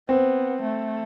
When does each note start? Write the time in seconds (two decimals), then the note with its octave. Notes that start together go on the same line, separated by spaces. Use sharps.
0.09 B3 C4
0.62 A3